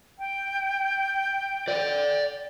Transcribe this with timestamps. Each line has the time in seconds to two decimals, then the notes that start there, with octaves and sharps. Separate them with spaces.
0.19 G5
1.68 D5 F#5